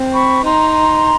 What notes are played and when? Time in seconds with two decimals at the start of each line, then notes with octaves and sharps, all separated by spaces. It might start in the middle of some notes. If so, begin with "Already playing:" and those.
Already playing: C4
0.14 B5 C#6
0.44 D#4 A#5 C6